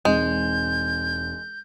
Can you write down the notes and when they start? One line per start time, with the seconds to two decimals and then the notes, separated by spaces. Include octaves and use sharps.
0.05 E1 G#3 C4 D#4 G6